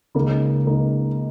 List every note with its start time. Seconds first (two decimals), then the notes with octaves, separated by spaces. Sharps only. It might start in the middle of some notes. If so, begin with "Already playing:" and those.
0.15 C#2 C#3 A#3 D#4
0.65 C#2 C#3 A#3 D#4